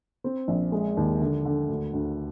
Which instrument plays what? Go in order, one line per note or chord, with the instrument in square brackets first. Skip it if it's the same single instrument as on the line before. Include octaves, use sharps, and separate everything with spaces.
[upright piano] C4
A#1
G#3
D#2
D3
D3
D2
D2